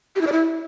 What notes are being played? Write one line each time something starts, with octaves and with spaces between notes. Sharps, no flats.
G4
E4
D5
E4